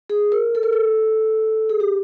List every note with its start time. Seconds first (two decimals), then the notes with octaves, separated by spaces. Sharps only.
0.10 G#4
0.32 A#4
0.55 A4
0.63 A#4
0.73 A4
1.69 G#4
1.80 G4